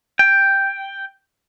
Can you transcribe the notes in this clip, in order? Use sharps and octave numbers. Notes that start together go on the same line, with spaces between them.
G5